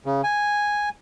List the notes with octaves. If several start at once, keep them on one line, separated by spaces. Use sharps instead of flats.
C#3
G#5